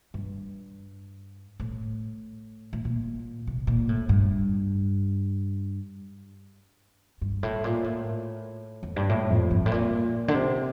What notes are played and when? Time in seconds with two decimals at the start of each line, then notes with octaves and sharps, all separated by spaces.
0.14 G2
1.60 A2
2.73 A2
2.85 A#2
3.47 C3
3.67 A#2
3.89 A2
4.09 G2
7.21 G2
7.43 A2
7.64 A#2
7.84 A2
8.83 F2
8.96 G2
9.09 A2
9.30 F2
9.51 G2
9.66 A2
9.72 A#2
10.28 D3
10.35 C3